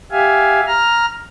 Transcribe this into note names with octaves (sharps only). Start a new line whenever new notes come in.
G4 E5 F5 G#5
A#5 F6